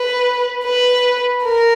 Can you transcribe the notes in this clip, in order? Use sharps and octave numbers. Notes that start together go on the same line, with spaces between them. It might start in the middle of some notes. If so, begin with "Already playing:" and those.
Already playing: B4
B4
A#4